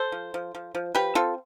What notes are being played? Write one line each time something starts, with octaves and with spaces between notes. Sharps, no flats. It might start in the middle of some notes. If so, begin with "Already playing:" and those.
Already playing: A4 C5
F3
F3
F3
F3
F3 G4 B4
C4 F4 A4